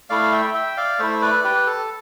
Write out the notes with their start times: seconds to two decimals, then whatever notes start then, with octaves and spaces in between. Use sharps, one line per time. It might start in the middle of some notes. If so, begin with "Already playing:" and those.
0.10 A3 E4 D5 F5
0.32 E5 G5
0.54 E5 G5
0.77 D5 F5
0.99 A3 E4 C5 E5
1.22 B4 D5
1.44 G4 B4
1.66 A4